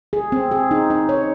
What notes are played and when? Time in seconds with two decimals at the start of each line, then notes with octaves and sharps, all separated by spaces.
0.13 G#4
0.32 C4
0.51 G#4
0.71 D#4
0.90 D#4
1.09 C#5